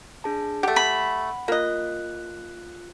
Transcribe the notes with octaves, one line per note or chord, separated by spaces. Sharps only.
D4 G#4 A5
A3 G4 F#5
B5
A#3 F4 D#5 F#6